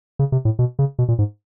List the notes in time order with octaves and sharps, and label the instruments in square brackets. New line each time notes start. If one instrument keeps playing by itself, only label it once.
[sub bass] C#3
C3
A2
B2
C#3
B2
A#2
G#2